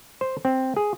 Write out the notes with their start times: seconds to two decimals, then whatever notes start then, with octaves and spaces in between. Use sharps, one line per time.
0.21 C5
0.45 C4
0.76 G#4